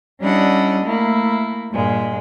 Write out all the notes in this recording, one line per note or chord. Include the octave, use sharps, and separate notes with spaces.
G3 C#4 D4 E4 D#5 F#5
A3 A#3 E4
G2 A#2 G#3